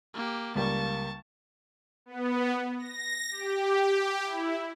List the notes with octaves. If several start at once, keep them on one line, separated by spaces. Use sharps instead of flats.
A#3 G4
C#2 G3 A#3 A5 C#6
B3
A#6
G4
E4